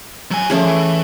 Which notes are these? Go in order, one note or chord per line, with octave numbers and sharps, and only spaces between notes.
F#3 G#5
D#3 F3 A3 C#4 G#4
E3